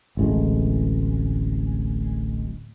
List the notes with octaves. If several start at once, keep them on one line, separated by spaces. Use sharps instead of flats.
D1 A1 G#3